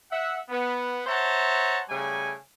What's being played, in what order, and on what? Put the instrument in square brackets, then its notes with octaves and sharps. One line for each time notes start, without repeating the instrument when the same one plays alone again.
[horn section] E5 F#5
B3
C5 C#5 E5 F#5 A5 A#5
C#3 G3 A3 G#5